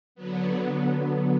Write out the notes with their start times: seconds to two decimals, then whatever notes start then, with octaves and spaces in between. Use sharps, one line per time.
0.15 D3 F#3 B3